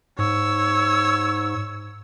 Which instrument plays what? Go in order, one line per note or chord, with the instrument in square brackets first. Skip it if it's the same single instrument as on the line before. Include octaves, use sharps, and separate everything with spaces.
[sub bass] G#2 [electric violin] C#5 E6